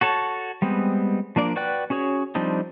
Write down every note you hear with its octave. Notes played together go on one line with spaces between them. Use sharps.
F#4 A4 C#5 A5
G3 G#3 B3 C4
F3 A#3 D4 D5
F#4 B4 D5 G5 F#6
C#4 F#4 G#4 C#5
F3 G3 C4 D4 D#4